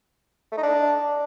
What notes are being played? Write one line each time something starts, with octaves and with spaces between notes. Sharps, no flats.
A3
D#4
D4